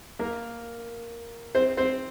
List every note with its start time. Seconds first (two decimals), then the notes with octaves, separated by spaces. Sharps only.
0.19 A#3 A#4
1.55 C4 C5
1.77 C4 C5